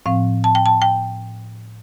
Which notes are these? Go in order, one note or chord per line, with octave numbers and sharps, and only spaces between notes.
A2 F3 C4 F5
A5
G5
A5
G5